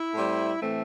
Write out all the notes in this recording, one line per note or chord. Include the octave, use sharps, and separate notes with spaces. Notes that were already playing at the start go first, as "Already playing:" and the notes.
Already playing: E4
A2 G3 C4
A2 E3 A3 C4